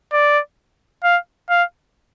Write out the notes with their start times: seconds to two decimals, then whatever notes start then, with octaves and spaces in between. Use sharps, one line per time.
0.12 D5
1.04 F5
1.49 F5